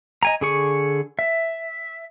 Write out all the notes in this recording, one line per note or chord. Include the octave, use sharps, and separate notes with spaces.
D#5 G#5 A#5
D3 G#4 C#6
E5